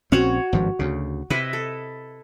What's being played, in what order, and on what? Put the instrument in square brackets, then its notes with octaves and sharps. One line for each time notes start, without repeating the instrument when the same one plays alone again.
[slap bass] A#1 C4 C#4 [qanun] F#4 C#5 F#5
[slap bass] G#1 G2 F3
D2 C#3
[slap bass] C3 [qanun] E4 B4 D#5
[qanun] A4